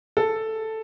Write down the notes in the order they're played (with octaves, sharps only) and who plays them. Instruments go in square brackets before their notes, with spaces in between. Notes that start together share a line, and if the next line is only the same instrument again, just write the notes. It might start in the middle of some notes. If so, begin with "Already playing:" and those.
[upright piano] A4